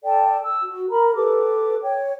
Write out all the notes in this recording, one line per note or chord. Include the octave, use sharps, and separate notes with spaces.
A4 D5 G5 A5
E6
F#4
A#4 A#5 B5
G4 A4 B4 D6
C#5 G5